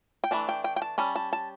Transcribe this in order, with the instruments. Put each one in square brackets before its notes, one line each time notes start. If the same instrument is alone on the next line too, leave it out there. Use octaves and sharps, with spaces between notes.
[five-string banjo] G5
E3 A3 D4 A5
G5
G5
G5
A5
G3 C#4 A5
A5
A5